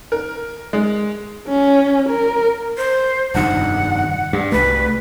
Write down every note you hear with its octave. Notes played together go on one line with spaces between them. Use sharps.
A#4
G#3
C#4
A#4
C5
F1 G2 D#3 F#5
G2
C2 A3 B4